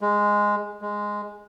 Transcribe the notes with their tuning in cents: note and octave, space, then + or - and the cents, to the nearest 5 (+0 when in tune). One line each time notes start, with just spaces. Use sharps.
G#3 -5
G#3 -5